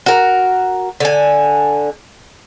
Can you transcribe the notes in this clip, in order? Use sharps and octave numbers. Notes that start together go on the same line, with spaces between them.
F#4 A#4
D3 G#5